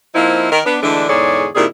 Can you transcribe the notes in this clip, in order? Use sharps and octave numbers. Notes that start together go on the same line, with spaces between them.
F3 A#3 C4 D#4 E4
D#3 A#4
B3 D4
D3 E3 G#3 A3 D4
E2 G#2 D3 G#4 C#5 D5
A#2 D#3 G3 C4 E4 G#4